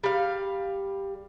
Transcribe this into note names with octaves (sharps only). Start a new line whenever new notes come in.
G3 F5